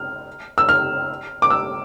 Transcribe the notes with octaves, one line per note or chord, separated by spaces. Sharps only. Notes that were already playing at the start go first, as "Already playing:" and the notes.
Already playing: F6
E6
F6
D6
E6